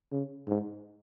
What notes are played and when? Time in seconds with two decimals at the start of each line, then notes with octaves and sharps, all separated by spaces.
0.12 C#3
0.48 G#2